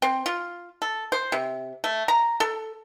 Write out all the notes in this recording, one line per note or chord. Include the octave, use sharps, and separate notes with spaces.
C4
F4
A4
C5
C3
A3
A#5
A4